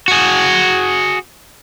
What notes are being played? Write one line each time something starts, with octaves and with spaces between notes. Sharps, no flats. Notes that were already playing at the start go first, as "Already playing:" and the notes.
F#4 G#4